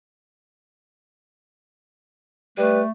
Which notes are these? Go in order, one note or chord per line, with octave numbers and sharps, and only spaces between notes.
G3 A3 B4